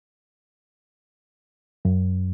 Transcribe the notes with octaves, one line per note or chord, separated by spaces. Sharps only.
F#2